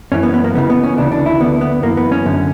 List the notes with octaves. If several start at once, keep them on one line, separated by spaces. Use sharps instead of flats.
F#2 E3 C#4
B3
B3
A#3
C#2 C#3 E3 B3
B3
C#4
D2 C#3 E3 D4
D4
E4
D2 D3 B3
B3
F#2 E3 A#3
B3
C#4
F#2 D3